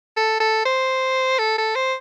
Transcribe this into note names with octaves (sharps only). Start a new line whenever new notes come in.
A4
A4
C5
A4
A4
C5